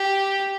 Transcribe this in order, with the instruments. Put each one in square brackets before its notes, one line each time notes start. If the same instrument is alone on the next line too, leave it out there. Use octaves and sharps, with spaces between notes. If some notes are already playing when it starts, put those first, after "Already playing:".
Already playing: [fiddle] G4